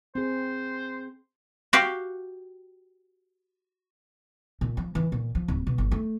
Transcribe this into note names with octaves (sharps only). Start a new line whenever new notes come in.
C4 G#4 C5
F#4 G4 F5
A#2
F3
E3
A#2
F3
D1
B2
G1
A3